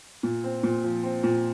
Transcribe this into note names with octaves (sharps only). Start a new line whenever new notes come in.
A#2
C4
A#2
F3
C4
A#2